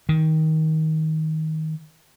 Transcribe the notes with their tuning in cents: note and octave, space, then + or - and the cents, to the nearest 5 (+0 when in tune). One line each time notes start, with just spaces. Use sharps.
D#3 +20